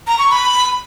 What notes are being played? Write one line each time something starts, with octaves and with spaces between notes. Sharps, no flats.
A#5
C#6
B5